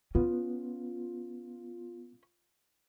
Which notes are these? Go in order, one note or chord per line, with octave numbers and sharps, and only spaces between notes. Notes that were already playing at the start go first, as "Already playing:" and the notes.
B3 C#4 F4